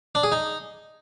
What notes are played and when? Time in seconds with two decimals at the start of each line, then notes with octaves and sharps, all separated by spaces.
0.15 D4
0.23 G#4
0.32 D#4